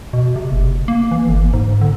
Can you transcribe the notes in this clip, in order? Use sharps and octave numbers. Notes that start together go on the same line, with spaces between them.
B2
C3
F#1
A#3
E3
G1
G#2
D3